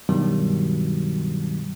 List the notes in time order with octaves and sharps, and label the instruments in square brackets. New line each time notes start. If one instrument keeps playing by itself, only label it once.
[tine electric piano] G2 B2 D#3 F#3 G3